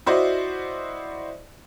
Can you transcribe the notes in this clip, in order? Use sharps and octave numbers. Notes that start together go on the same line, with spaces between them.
E4 F#4 C5 D5 D#5